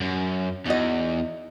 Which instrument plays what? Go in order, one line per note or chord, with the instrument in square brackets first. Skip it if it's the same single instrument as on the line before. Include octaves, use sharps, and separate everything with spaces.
[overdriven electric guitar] F#2
[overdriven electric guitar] E2 [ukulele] D#4 F#4 D#5